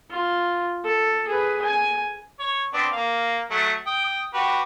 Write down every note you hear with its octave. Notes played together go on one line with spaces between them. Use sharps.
F4
A4
G#4 B4
G#5
C#5
B3 C4 D4
A#3 F5
F#3 A3 F#5
G5 D#6
F#4 G4 B4